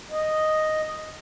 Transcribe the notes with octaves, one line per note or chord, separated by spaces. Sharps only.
D#5